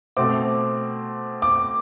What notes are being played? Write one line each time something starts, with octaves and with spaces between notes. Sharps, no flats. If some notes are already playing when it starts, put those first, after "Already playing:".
B2 A3 C4 D6
D6